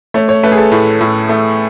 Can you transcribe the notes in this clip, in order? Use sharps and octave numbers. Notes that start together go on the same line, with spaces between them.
A3 C#5
C#5
A3 B4
G#4
A4
A2
A2
A3